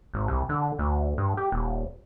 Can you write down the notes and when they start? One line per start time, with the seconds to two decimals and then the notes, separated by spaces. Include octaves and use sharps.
0.14 G#1
0.28 C2
0.49 D3
0.79 D2
1.18 G2
1.37 G4
1.52 D#1